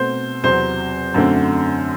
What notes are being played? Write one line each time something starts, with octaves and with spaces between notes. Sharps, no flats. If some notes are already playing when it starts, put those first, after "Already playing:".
Already playing: B2 A3 C4 C5
E2 C3 F#3 C4 C5
F#2 D3 A3 C4